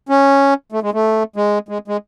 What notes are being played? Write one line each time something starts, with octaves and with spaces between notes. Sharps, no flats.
C#4
A3
G#3
A3
G#3
G#3
G#3